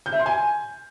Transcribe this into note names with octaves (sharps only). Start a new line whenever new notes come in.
G6
E5
C6
G#5